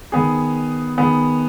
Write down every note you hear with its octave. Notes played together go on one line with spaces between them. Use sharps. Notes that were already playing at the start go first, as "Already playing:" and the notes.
D#3 B3 G#4
D#3 B3 G#4